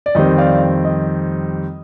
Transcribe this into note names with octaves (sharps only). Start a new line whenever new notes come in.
D5
F2 D#3 G3 C4 D#5
D5 F5
D#5